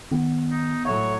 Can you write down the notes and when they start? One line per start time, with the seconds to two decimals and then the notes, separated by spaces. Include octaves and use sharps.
0.11 D#3 B3
0.50 D#4
0.85 A2 F#3 C#5 E5